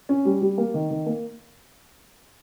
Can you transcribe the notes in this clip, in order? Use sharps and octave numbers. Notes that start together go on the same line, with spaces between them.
C#4
G3
G3
A#3
D#3
D#3
A#3